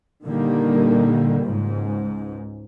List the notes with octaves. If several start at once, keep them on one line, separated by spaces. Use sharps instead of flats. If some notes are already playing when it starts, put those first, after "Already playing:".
A#2 D3 D#3 G3 A#3
C#2 G#2